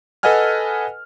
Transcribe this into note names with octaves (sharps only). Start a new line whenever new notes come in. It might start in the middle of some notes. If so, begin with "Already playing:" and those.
A4 B4 D#5 F#5 G#5 F6